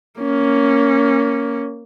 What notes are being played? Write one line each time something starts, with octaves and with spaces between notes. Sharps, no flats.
A#3 C#4